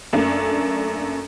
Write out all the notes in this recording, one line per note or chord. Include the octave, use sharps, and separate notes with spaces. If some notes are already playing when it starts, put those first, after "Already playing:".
F#2 A3 A#3 D4